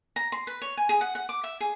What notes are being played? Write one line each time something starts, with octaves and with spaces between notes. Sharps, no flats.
A#5
C6
B4
C#5
G#5
G#4
F#5
F#5
D6
E5
G#4